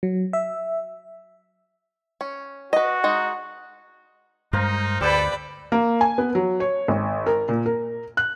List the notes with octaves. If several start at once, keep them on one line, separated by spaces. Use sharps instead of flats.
F#3
E5
C#4
F#4 B4 D#5
G#3 D#4
G2 G#3 D#4 A#4 C5 F5
D2 G4 A4 B4 D5 G5 B5
A#3
G#5
B3
F#3
C#5
G#1
A#4
A#2
A#4
F#6